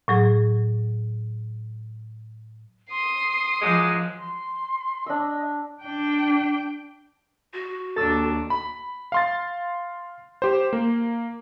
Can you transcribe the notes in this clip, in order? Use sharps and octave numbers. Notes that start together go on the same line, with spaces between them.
A2 F#3 G#4
C6 D#6 C7
F#2 F3 G#3 D6
C6
D4 D#5 E6
D4 G5
F#4
D#2 D4 A4 E6 A6
B5
F5 C6 A6
G4 C5
A#3